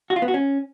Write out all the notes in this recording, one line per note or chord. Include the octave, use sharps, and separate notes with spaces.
F#4
F4
B3
F#4
C#4